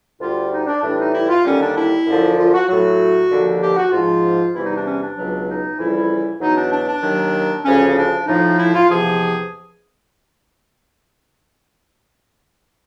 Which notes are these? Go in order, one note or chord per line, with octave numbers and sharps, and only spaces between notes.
D2 D3 G3 F4
D#4
D4
A2 E3 G3 D4
D#4
E4
F4
D#2 D3 G3 C#4
D4
E4
F#2 D3 F3
F4
F#4
A2 F#3 F#4
D#2 D3 F3
G4
F#4
G#2 F3 F4
E2 C3 E3 G3 E4
D#4
D4
C#4
D4
C#2 B2 F#3
D#4
F2 C#3 E3 G3 E4
E2 B2 F#3 D#4
D4
D4
D4
D#2 D#3 F#3
D2 C#3 F3 C#4
C#4
D4
A2 F3 D#4
E4
F4
E2 C3 F3 G#4